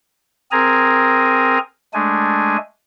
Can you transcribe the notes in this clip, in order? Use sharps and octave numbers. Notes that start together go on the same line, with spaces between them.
C4 G#4 A#4 G#5 A#5
G#3 A3 D4 G#5